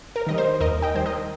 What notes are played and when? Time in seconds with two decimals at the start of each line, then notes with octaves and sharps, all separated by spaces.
0.16 A#4
0.27 D#3 G3 D#5
0.38 C5
0.60 D#2 A#4 D#5
0.82 D#5 G5
0.95 D#3 G3 C5
1.06 A#4 D#5